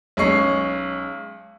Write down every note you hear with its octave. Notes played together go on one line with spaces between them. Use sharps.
B1 G#3 C#4 C#6 C7